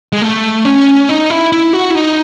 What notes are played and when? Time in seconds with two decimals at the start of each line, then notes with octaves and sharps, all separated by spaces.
0.13 G#3
0.22 A3
0.65 C#4
1.09 D#4
1.30 E4
1.52 E4
1.73 F#4
1.90 E4
1.95 D#4